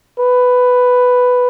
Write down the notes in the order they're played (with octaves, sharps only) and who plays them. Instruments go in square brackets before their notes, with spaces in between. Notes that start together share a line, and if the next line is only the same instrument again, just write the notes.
[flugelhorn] B4